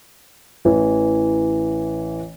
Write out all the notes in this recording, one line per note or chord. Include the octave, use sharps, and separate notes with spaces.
A1 E3